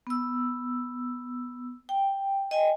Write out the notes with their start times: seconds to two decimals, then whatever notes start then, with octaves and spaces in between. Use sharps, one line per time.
0.07 B3 E6
1.89 G5
2.51 D#5 G5 G#5